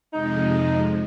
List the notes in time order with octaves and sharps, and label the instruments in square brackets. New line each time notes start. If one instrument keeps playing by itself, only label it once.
[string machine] F2 C3 F3 G#3 [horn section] D#4